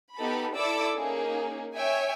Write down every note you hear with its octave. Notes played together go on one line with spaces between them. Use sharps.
B3 D#4 G4 A4 B5
E4 A4 D5 D6 E6
A#3 C#4 D#4 G#4
C#5 E5 G5 G#5